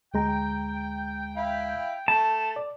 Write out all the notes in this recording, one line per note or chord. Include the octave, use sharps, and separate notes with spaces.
D2 G#3 G5 A#5
E4 F5
A3 A5
D5